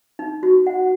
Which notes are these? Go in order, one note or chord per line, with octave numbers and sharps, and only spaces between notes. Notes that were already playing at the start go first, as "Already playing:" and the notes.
D#4
F#4
F#5